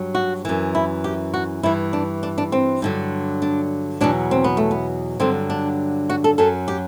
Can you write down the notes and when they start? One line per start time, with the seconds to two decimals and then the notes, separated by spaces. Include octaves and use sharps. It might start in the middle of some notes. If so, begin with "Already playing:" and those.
Already playing: G2 F#3
0.15 F#4
0.45 F#2 E3
0.75 E4
1.04 G4
1.34 F#4
1.63 G2 E3 E4
1.93 D4
2.23 D4
2.38 D4
2.52 C4
2.82 G2 D3 F#3
3.42 D4
4.01 E2 B2 F#3 D4
4.31 C4
4.44 B3
4.57 A3
4.71 B3
5.20 G2 D3 F#3 C4
5.50 D4
6.09 F#4
6.24 A4
6.38 F#2 F#3 A4
6.68 G4